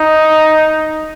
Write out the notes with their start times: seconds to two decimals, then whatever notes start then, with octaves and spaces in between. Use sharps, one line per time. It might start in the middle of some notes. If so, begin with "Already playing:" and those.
Already playing: D#4